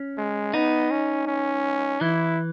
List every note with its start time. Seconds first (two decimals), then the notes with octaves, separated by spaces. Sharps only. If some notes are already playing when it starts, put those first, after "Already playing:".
Already playing: C#4
0.18 G#3
0.54 B3 D#4
0.91 C#4
1.27 C#4
2.01 E3 E4